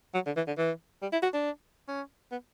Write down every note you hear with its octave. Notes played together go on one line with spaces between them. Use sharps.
F#3
D3
E3
D3
E3
G3
E4
F#4
D4
C#4
B3